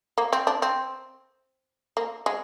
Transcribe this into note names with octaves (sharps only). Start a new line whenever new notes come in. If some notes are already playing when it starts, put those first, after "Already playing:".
A#3
C4
D4
C4
A#3
G#3